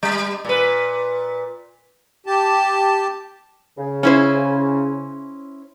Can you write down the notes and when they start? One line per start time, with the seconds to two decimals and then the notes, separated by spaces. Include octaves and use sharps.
0.03 G3
0.45 A#2 B4
2.26 G4 A5
3.78 C#3
4.03 C#4 E4 C5